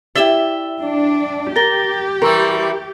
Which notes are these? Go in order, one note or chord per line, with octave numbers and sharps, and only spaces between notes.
E4 G4 D5 E5 G5 E7 G7
D4
G4 A#4 A6 A#6 G7
E3 G3 A#4 C6 C#6 E6